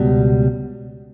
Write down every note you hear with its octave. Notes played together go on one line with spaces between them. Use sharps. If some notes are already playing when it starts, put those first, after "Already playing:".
Already playing: C#2 B2 G3